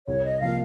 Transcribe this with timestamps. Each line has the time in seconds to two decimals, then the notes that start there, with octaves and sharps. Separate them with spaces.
0.07 C2 C#5
0.24 D#5
0.41 C3 F3 A#3 F5